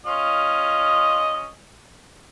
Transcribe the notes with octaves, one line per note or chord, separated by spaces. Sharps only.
C#4 F4 D#5